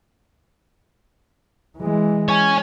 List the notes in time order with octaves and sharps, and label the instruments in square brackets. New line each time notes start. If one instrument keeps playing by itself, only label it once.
[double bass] E3 G#3
[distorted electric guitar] C#5 G#5